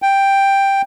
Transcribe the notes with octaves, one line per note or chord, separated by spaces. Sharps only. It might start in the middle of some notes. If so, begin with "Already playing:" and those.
G5